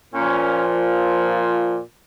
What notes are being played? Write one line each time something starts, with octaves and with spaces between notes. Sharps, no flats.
A#2 F3 C#4